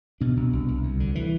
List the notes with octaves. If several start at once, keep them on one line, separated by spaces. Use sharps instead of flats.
B2 D4
C2
C2
C2
D2
D3
E3